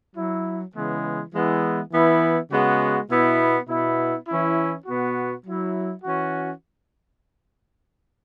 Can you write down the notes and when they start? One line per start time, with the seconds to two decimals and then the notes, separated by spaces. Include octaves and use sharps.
0.16 F#3 E4
0.74 C#3 E3 G#3 B3
1.33 E3 G#3 B3 E4
1.92 E3 B3 E4
2.51 C#3 G#3 B3 F#4
3.10 B2 B3 E4
3.68 B2 B3 E4
4.27 E3 C#4 E4
4.86 B2 B3 F#4
5.45 F#3 E4
6.04 E3 C#4 F#4